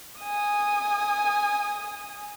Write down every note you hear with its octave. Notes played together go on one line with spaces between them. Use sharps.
G#5 D#6